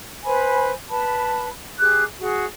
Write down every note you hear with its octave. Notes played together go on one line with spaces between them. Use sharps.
B4 C5 G#5 B5
B4 A5 B5
G4 G#4 D6 F#6
F#4 G#4